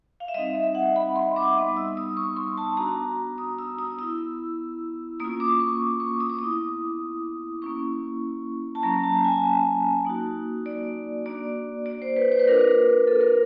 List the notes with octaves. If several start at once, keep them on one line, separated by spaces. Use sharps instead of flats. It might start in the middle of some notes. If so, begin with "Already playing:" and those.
F5
E5
G3 C4 D#4 D#5
E5
F#5
B5
C6
D6
G3 B3 D#4
E6
D#6
C#6
C6
A5
B3 D4 F#4 A#5
D#6
E6
D#6
B3 E4 E6
A#3 C#4 F4 D#6
D6
C#6
C#6
D#6
D6
B3 E4 D#6
A#3 C#4 E4 C#6
A5
F#3 A#3 C#4 A#5
A5
G#5
A#3 D#4 F#4
D5
A#3 D4 F#4 D5
D5
C5
B4
C5
B4
A#3 D4 F4 A#4
A4
A#4